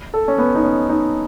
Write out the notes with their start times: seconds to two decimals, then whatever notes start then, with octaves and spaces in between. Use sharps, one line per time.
0.14 A4
0.28 C#4
0.38 B3
0.55 D#4
0.64 C#4
0.89 D#4